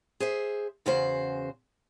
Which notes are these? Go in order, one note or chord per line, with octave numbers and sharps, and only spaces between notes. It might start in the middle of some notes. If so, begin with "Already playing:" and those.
G#4 C5 E5
E2 C#3 F#4 C5